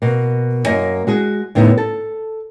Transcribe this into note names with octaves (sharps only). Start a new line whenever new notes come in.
B2 A#3
F#2 A#3 D#5 G#5
G#3 F#4 G#4
D#2 A2 D3 B3 D#4
A4